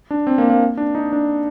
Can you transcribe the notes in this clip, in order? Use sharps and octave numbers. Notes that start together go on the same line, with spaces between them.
D4
C4
A#3
A#3
D4
D#4
D4